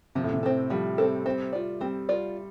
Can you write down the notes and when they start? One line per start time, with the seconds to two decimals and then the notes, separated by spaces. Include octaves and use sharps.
0.15 C3 F3
0.24 A2
0.33 C3
0.43 C4 A4
0.70 F3 G3
0.98 C4 A4
1.26 C4
1.53 F4 D5
1.81 G3 C4
2.09 F4 D5